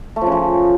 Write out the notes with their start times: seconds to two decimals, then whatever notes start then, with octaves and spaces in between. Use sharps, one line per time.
0.16 A3
0.21 F3
0.26 C#3
0.32 F3